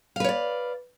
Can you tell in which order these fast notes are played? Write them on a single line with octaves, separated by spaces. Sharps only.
F5 B4 C#5 D5